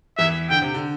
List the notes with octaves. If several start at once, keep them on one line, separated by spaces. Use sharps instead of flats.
E2 E3 E5
D3 G5
C3
D3